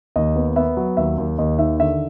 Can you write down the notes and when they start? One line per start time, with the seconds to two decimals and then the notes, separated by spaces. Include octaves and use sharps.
0.16 D#2 D#5
0.36 B3
0.56 B3 E5
0.77 F#3
0.97 D#2 E5
1.18 D#2
1.38 D#2 D#5
1.59 D#3 E5
1.79 D3 E5